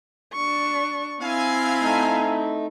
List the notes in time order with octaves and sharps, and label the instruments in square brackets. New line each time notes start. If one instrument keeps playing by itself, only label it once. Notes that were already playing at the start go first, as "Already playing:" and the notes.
[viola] D4 C#6
[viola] C4 E4 [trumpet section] F5 G#5
[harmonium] A3 D#4